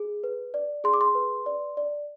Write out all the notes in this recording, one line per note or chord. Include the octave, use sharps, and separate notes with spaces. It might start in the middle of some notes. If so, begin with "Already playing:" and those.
Already playing: G#4
B4
D5
G#4 C6
D6
C6
B4
D5
D5